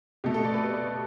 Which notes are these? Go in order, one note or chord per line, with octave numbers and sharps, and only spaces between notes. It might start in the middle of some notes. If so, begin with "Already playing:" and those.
B2 A3 G4
A4
D5
B4
B4
D5
D5